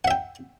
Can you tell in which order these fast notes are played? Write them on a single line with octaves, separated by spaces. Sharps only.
F#5 E5 G5